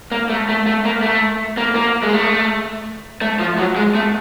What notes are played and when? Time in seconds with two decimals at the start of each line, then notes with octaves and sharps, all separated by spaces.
0.12 A#3
0.30 A3
0.49 A3
0.66 A3
0.85 A#3
1.02 A3
1.57 A#3
1.76 A#3
2.03 G#3
2.13 A3
3.21 A3
3.39 F3
3.58 F#3
3.76 G#3
3.95 A3